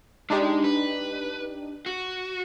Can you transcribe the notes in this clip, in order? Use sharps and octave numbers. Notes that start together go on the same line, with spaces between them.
G#3 D4 D#4 G4
B4
F#4